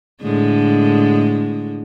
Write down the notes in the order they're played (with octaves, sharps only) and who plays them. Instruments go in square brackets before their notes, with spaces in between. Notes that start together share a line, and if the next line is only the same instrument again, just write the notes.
[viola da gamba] A2 D3 G#3